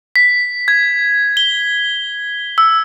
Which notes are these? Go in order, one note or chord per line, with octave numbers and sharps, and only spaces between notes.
B6
G#6
G7
E6